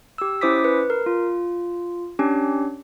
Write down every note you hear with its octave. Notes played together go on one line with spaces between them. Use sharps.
G4 E6
C#4 E4 C5 D6 D#6 B6
B4
A#4
F4
C#4 D4 G4